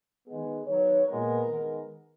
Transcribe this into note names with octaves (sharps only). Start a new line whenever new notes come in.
D#3 G#3 B3 G#4
D#3 F#3 B3 C#5
A#2 G#3 B3 A#4
D#3 G#3 B3